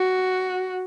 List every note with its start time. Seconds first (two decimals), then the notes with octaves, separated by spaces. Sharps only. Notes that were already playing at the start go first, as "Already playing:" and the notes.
Already playing: F#4